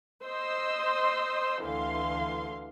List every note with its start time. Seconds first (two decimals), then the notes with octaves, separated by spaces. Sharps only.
0.24 C5 D#5 C6 E6
1.62 D2 D3 E3 F5 C6